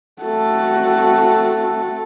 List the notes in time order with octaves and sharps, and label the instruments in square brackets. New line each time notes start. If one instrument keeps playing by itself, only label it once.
[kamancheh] A3 A4 [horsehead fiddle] C4 F#4